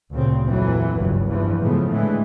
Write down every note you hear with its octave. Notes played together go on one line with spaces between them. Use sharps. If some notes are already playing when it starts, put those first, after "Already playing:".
D2 A#2 C#3 C4
A#1 F2 E3 F#3
F#1 C#2 G2
E2 G2 E3 F3
A2 C#3 F3 G#3 A3 B3
A2 D3 E3 G#3